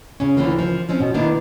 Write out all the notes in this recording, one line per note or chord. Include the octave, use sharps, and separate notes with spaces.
C#3 C#4
D2 G#2 D3 E3 A#3 F4
F3
F3 C4 C#4
B2
D#3 A#3 B3 D4 E4